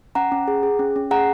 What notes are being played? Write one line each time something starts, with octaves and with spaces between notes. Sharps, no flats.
C#4 F#5 A#5
C#4
G#4
G#4
C#4
C#4
G#4 F#5 A#5